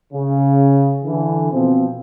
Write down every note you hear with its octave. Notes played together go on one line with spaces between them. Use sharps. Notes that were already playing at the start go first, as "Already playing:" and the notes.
C#3
D3 E3
B2 F3 C4